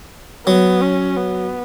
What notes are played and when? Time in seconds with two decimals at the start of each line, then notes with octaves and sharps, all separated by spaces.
0.46 F#3 B3
0.81 C#4
1.17 B3